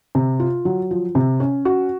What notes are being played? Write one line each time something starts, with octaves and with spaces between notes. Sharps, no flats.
C3
F4
F#3
F3
C3
C#4
F#4